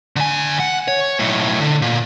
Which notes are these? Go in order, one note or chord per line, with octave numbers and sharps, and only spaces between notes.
D3 G#5
F#5
C#5
B1 A2
D3
A#2